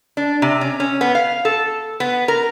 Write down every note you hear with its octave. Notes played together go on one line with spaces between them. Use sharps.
D4
C3
C#4
C#4
B3
F5
A4
B3
A#4